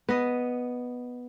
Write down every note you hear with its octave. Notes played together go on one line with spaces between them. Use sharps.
B3 D#5